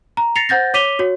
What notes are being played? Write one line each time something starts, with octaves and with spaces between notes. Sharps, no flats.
A#5
A6 A#6 C7 C#7 F7
C5 F#5 G6 A6 A#6
C#5 D6 B6 D#7 F7 G7
F#4 C#5